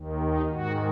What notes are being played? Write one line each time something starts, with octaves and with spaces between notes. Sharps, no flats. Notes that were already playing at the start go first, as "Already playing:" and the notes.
Already playing: D#2 D#3
D#4
G#2 D#3 F#4